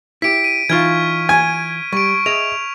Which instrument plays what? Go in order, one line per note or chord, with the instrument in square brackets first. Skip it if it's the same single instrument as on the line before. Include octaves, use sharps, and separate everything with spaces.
[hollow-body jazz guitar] E4 G4 [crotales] B6 D7
[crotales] D#7
[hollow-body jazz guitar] E3 D#4 F4 [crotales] C#6 F6 G#6
[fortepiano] G#5 [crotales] D#7
[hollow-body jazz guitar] G3 [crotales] C#6 D7
[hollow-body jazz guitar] G#4 D#5 E5 [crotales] F7